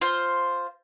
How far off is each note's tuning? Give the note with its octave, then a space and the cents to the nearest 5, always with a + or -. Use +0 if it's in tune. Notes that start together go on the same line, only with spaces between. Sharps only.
F4 +0 C5 +0